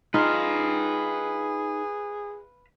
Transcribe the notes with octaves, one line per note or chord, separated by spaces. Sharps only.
D#4 F4 G#4 B4 F5